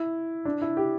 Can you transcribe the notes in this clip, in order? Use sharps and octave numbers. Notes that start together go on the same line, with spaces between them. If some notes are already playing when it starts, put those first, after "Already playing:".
Already playing: E4
D4
E4
G4